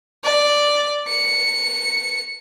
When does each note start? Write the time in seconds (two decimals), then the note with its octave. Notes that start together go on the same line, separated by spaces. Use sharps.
0.24 D5
1.08 C#7